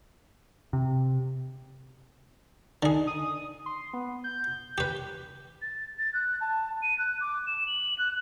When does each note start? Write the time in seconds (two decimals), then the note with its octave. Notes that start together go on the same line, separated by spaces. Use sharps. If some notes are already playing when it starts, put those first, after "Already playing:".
0.73 C3
2.83 D3 D#4 G#4
3.07 D#6
3.66 C6
3.93 B3
4.24 G6
4.78 G4 B4
5.62 A6
5.99 A6
6.14 F#6
6.41 A5
6.82 D#7
6.98 F#6
7.21 D6
7.47 E7
7.67 F#7
7.98 F#6